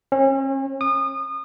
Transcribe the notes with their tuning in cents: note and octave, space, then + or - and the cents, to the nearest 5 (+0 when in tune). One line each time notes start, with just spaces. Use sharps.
C#4 -40
D#6 -30